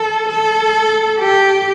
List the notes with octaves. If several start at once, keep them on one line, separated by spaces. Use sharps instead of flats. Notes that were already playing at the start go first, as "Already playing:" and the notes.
Already playing: A4
A4
G4